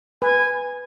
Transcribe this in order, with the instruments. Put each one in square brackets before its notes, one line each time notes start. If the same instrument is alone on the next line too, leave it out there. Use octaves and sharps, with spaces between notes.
[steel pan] B4 [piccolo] G#5